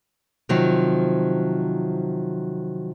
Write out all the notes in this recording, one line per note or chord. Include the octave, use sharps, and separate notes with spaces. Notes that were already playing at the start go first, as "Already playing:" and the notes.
C3 D#3 F3 F#3 C4